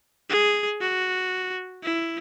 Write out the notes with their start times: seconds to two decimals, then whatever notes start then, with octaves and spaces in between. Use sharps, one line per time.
0.30 G#4
0.81 F#4
1.84 E4